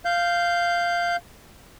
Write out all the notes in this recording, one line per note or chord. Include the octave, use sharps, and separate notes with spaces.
F5 G6